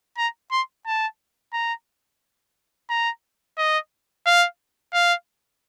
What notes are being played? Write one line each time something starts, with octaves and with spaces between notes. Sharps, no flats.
A#5
C6
A5
A#5
A#5
D#5
F5
F5